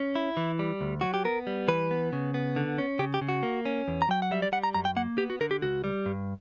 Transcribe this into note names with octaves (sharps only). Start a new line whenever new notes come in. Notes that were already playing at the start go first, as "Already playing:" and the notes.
Already playing: C#4
E4
E3
G3
D2
F#3 F#4
G4
B3 A#4
G3
E3 B4
B3
C#3
B3
D3
C#4
C#3 G4
G4
C#3
F#4
A#3
C#4
E2
A#5
F#3 G5
F#5
G3 E5
D5
G3 F#5
A#5
F#2 A#5
G5
A#3 F#5
B3 G4
F#4
D3 A#4
G4
C#2 F#4
G3
G2